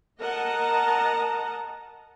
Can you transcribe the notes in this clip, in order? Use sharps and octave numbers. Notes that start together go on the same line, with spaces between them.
A#4 D#5 F#5 A5 A#5